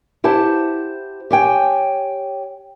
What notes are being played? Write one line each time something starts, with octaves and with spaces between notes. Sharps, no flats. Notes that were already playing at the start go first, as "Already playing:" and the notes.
E4 G4 C5 F#5 A5
G4 C#5 G5 G#5